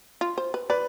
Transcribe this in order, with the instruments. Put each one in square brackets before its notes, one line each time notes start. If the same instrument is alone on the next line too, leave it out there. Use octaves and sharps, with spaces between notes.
[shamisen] F4
C5
B4
[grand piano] B4 [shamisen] D5